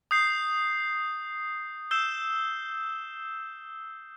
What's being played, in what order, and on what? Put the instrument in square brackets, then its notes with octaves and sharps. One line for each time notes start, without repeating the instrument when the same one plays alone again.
[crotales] D#6 G6 C7
E6 G6 C7 E7 G7